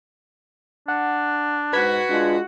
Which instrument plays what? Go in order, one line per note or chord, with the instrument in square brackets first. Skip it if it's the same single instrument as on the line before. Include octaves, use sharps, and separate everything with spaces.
[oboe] D4 [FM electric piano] F#5
[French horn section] G#2 [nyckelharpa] F#4 F#5 [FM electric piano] B4 G#6 B6
[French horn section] G#3 D4 F4